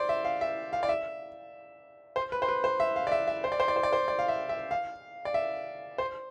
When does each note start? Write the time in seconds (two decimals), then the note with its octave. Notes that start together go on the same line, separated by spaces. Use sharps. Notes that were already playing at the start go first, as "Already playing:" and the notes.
Already playing: C5 D5
0.09 E5
0.25 F5
0.41 E5
0.73 F5
0.83 D5
0.89 E5
2.16 C5
2.32 B4
2.42 C5
2.48 B4
2.64 C5
2.80 E5
2.96 F5
3.07 D5
3.12 E5
3.28 E5
3.44 C5
3.52 D5
3.60 C5
3.68 D5
3.76 C5
3.83 D5
3.93 C5
4.08 D5
4.19 F5
4.28 E5
4.49 E5
4.71 F5
5.25 D5
5.34 E5
5.98 C5